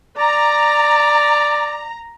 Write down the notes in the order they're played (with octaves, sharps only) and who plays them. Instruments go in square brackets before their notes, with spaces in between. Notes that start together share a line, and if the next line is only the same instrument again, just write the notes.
[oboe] D5 [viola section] A#5